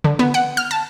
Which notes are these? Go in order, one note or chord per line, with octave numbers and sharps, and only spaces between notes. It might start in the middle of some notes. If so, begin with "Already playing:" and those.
D3
B3
F#5
F6
A5